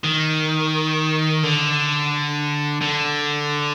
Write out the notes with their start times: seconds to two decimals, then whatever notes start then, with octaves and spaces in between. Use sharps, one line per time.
0.04 D#3
1.43 D3
2.82 D3